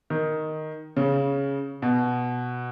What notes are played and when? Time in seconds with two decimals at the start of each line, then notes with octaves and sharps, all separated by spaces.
0.10 D#3
0.97 C#3
1.82 B2